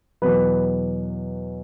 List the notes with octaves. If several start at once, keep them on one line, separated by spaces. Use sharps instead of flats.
E2 B2 F#3 B4